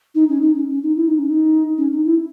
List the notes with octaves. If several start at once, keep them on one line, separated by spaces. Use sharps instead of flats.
D#4
C#4
D#4
C#4
C#4
D#4
E4
D#4
C#4
D#4
C#4
D#4
E4